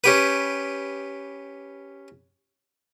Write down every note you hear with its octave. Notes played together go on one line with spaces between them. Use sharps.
C#4 G4 B4